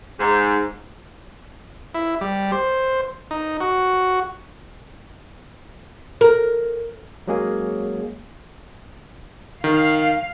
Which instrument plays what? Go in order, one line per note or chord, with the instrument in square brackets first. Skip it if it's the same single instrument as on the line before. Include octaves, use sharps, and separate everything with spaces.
[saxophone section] G#2
[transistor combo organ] E4
G3
C5
D#4
F#4
[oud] A#4
[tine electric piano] F#3 G#3 A#3 C#4 G#4
[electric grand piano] D#3 [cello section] F5